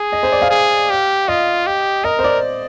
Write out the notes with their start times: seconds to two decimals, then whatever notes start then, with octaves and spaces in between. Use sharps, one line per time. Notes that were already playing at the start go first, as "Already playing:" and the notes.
Already playing: G#4
0.12 D#5
0.23 C5
0.32 D5
0.42 F5
0.51 G#4
0.90 G4
1.28 F4 D#5
1.66 G4
2.04 A#4 D#5
2.19 C5
2.24 D5